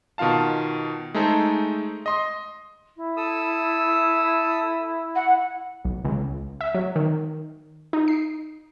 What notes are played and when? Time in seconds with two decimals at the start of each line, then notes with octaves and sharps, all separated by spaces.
0.18 B2 D#3 F4 F5 A5
1.14 G#3 A3 D#4 G#4 A4 C5
2.06 D#5 C6 D#6
2.97 E4
3.17 A4 D#6 E6
5.15 F#5
5.85 B1
6.05 C#2
6.61 E5
6.74 F#3
6.96 D#3
7.93 D#4
8.08 C7